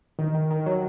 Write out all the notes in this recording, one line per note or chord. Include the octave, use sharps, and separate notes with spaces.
D#3
D#3
D#3
F#3